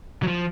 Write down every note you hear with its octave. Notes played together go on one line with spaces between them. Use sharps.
F#3
F3